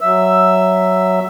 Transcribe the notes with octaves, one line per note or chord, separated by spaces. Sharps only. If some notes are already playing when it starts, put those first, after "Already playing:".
F#3 E5 E6